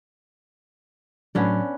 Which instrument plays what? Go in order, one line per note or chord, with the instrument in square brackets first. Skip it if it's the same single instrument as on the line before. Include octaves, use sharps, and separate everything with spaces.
[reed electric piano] A2 F#3 [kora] B3 C#4 D4